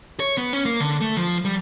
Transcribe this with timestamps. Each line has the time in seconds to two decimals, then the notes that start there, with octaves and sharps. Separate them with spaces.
0.20 C#5
0.38 B3
0.53 C#4
0.65 A#3
0.80 D3
1.01 A3
1.17 F3
1.45 G3